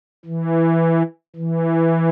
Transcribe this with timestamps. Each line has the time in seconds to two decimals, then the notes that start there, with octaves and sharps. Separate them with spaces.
0.25 E3
1.36 E3